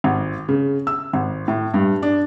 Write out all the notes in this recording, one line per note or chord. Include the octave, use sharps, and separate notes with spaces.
G#1
C#3
E6
G#1
A2
G2
D4